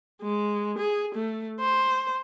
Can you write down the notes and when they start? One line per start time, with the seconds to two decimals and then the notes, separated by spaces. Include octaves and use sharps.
0.22 G#3
0.78 G#4
1.15 A3
1.60 C5